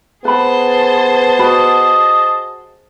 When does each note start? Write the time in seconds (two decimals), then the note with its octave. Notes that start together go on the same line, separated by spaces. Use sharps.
0.25 B3 G#4 B4 C5 A5 B5
1.39 F#4 D#5 B5